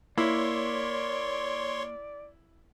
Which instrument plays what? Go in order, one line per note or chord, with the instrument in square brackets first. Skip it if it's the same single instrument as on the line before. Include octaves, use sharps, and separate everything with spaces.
[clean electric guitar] A#3 [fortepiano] E4 [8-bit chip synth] C#5 C6 C#6 [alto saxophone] D5